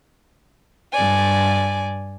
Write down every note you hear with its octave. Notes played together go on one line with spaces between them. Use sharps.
G2 D5 G#5